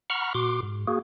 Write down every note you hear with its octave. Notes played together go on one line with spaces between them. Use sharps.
F#5 A#5 B5 C#6 F6
A#2 F#4 C6 D6
G#2
A#3 F#4 G#4